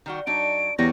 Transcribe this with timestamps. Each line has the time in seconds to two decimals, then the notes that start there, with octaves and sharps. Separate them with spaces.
0.06 D#3 G3 F#4
0.27 F#3 D4 D#4 D7
0.78 E2 F#3 G3 C#5 A#6